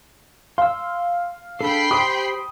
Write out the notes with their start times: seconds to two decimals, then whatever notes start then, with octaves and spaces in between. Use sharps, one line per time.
0.58 F5 C6 E6
1.61 D4 G#4 A4 G5 B5 C7
1.91 G4 C5 C6 D#6